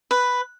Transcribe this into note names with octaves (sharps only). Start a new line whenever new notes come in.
B4